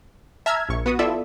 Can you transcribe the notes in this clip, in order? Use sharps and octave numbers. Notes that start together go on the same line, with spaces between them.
E5 A5 A#5 F6 G#6
A#1 C#6
B3 F#4 D#6
E4 F4 A4 D5 E5